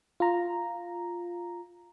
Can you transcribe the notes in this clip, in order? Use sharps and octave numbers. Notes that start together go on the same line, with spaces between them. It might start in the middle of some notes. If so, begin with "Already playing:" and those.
F4 A#5